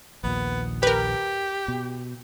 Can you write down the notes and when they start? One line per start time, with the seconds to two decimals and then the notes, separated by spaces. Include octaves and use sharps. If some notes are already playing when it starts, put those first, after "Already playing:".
0.24 A#1 D#2 A#2 B3
0.83 G4 A#4 B4
1.68 B2